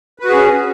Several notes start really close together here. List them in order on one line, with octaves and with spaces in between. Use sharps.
B4 F#4 G#4 C#4